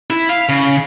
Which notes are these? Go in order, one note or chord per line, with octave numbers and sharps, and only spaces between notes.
E4
F5
C#3